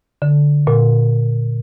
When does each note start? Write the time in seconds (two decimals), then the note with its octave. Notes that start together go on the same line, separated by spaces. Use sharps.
0.22 D3
0.67 A#2